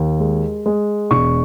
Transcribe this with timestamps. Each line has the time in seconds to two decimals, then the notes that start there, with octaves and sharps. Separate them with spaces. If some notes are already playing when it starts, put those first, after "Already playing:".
Already playing: D#2
0.20 G#3
0.66 G#3
1.11 E1 C#6